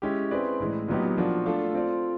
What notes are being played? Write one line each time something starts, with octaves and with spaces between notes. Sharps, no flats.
G#3 C#4 E4 G4
C4 E4 G#4 B4 D5
A2 E3 G#3
A#2 F#3 B3 D#4 G4
F3 A#3 D4 F#4
A3 D4 F4 A4
C4 F4 A4 D5 F5